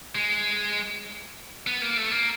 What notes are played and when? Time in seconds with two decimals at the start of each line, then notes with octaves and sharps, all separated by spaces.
0.15 G#3
1.67 B3
1.82 A#3
1.97 A3
2.11 A#3